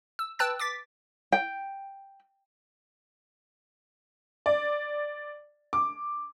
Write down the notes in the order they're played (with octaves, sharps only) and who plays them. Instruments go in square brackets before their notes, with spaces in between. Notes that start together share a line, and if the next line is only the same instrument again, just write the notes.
[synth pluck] E6
B4 G5 A5 E6 F#6 A6
D6 A6 B6
[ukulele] G5
[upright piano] D5
D6